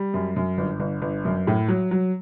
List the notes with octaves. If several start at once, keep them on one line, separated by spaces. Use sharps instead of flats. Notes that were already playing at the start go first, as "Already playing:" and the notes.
Already playing: G3
F#2
F#2
G1
G1
G1
F#2
A2
F#3
F#3